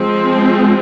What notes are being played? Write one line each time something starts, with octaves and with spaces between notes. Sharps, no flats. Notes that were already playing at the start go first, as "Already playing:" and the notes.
Already playing: F3 G#3 C4